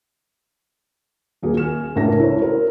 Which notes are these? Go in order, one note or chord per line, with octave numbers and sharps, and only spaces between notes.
D#1 A#3 G#4
G#5 F6 E7
C#2 A2 D4 A#4 A#6
E4 A4 C5 C#5
A#4